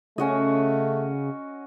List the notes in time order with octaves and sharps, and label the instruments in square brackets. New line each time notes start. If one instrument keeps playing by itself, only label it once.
[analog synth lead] C#3 [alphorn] A3 [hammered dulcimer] C#4 F#4 D#5